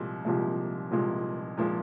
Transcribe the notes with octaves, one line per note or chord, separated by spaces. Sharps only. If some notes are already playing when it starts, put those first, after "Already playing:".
Already playing: C2 A#2 F3 G#3
C2 A#2 F3 G#3
C2 A#2 F3 G#3
A#2 F3 G#3